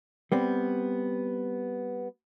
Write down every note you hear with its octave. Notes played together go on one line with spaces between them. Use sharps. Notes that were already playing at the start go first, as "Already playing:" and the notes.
G3 B3 C4